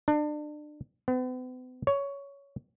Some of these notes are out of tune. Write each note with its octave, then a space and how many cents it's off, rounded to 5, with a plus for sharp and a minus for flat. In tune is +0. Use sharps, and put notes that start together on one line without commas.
D4 +30
B3 +45
C#5 +15